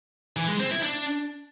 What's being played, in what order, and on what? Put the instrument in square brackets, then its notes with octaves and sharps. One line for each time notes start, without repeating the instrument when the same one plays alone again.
[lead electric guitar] E3
G#3
C4
E4
D4